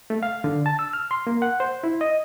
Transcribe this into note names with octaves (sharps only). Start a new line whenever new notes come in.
A3
F5
D3
A5
E6
F6
C6
A#3
F#5
C5
E4
D#5